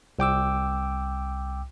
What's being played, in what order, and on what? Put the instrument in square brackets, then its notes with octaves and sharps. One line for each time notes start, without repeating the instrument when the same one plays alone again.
[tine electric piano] C2 G5 D6 E6